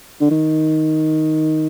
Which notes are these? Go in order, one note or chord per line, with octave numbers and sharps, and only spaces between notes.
D3
D#3